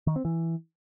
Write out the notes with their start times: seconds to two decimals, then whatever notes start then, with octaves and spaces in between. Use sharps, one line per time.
0.07 D#3
0.16 C4
0.25 E3